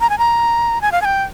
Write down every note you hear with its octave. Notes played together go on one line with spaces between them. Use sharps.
A#5
G#5
A#5
G#5
F5
G#5
G5